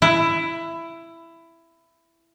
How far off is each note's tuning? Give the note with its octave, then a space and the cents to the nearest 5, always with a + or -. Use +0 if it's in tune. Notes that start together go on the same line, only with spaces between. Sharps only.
E4 +15